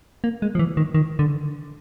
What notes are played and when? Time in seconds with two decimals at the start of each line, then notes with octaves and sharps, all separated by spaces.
0.24 A#3
0.42 G#3
0.55 F3
0.59 E3
0.77 D#3
0.94 D#3
1.19 D3